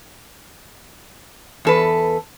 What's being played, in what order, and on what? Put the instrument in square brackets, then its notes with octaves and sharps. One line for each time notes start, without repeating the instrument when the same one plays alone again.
[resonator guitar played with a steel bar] E2 A4 B4